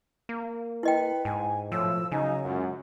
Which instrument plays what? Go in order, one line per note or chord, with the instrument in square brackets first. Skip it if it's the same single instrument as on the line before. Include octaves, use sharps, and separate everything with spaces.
[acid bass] A#3
[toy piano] E4 D#5 G5 [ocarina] B4
[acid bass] G#2 [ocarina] G#5
[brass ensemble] B1 A2 [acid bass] F3 [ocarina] E6
[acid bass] C#3 [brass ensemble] F#3 D#4 [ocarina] G#5
[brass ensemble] C#2 F#2 [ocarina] F#5